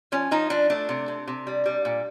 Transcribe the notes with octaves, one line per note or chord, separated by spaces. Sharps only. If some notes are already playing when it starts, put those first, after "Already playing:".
F3 C#4
F3 D#4
F3 D4
A3 D4
C3
C3
C3
G3
G3
A#2